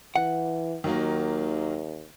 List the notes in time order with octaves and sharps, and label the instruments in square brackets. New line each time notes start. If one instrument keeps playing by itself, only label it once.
[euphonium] E3 [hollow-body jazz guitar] F#5
[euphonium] D#2 [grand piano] D#3 F#3 A#3